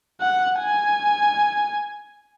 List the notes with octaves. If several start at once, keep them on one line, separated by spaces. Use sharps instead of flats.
F#5
G#5